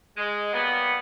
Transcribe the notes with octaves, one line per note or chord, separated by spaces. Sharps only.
G#3
F#3 G3 A#3 B3